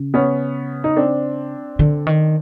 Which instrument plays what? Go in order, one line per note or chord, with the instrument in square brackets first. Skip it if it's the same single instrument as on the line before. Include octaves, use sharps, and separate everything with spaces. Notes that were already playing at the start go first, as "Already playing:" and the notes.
Already playing: [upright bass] C#3
[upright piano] B3 C#4
D#4
C4 D4
[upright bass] D3
D#3